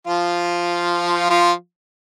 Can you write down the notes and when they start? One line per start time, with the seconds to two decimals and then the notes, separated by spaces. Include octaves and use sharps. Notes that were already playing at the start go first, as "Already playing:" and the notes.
0.07 F3 F4
1.30 F3 F4